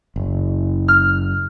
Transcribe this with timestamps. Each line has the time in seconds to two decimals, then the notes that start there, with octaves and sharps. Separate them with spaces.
0.16 F#1
0.88 F6